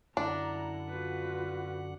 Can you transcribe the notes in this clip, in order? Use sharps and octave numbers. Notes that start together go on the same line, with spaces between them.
F#2 D3 D4 E4 F#5 A#5
F4 F#4 B4